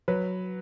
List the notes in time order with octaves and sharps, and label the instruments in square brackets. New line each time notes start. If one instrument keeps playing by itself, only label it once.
[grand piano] F#3 B4